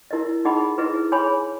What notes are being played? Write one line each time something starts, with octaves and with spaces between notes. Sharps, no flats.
E4 A#4 D#5
D#4 G#4 D#5 F#5 B5
E4 G#4 B4 D#5
G#4 C#5 G#5 B5